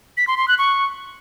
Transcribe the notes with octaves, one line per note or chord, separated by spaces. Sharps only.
B6
C6
C6
F#6
C#6